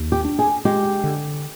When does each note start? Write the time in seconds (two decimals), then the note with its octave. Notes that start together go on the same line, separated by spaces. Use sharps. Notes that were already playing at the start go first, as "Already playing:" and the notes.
Already playing: D#2
0.12 G4
0.25 D4
0.39 G#4
0.65 G#3 G4
1.04 D3